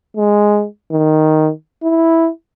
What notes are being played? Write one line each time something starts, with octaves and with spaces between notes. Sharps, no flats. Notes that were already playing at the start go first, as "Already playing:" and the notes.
G#3
D#3
E4